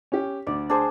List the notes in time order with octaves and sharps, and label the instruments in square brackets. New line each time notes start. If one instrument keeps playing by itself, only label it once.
[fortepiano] C#4 G4
[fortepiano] D2 [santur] D5
[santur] D4 G#4 C5